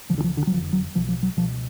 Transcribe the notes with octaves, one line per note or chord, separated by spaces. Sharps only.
D2 C#3 F3
D3
F3
D3
F#3
F#1 F2 D3 F3
F#3
B1 B2 F3
F3
F#3
C#2 B2 F3